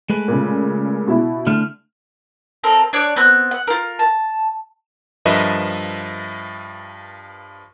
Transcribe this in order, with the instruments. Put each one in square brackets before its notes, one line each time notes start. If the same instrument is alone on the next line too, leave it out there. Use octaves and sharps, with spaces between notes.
[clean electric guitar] G#3 A3 B4
[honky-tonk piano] A#2 C#3
B2 E4
[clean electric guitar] D3 A3 [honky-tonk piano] F6
[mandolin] C4 A4 A#4
D4 C#5 D5
B3 C4 F#6
F#5
F4 A#4
A5
[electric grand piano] G2 F3 A#4 B4 D#5 E5